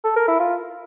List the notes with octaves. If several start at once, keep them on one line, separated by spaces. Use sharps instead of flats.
A4
A#4
E4
F4